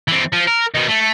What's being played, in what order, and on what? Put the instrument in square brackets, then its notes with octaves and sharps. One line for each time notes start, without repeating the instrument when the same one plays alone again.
[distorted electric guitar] E3 C4
F3
A#4
B2 D#3
A3